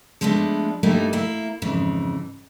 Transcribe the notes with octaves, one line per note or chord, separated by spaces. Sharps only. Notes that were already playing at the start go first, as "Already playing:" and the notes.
F3 G#3 A3 B3 D4
G2 G3 A3 A#3 D#4 F#4
A#3 E4
F2 G#2 C#3 E3